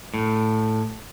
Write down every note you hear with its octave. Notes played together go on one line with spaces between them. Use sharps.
A2